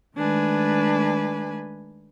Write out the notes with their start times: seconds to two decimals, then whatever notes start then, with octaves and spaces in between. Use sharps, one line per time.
0.16 D#3 G#3 A3 D4 B4 G#5